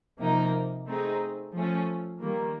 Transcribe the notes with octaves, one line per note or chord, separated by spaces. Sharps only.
C3 F3 A#3 D#4
A3 C4 D#4 G#4
F3 A3 C#4
D#3 G3 A#3